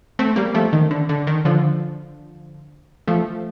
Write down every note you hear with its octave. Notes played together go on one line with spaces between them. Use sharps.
A3 C4
G3 A#3
F3 A3
D#3
D3
D3
D#3
D3 F3
F3 A3